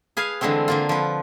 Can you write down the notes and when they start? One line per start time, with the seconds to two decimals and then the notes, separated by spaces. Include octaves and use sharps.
0.17 G#4 B4 F5 G#5
0.41 D3 E3 G#3 A3 C4
0.68 D3 A#3 F4
0.89 F3 B4